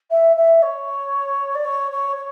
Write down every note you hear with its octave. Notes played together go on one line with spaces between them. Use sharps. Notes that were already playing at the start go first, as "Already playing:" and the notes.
E5
E5
C#5
D5
C#5
C#5
C#5